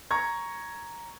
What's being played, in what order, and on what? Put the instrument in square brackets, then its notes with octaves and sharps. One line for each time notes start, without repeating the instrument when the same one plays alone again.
[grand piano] A#5 C#6 G#6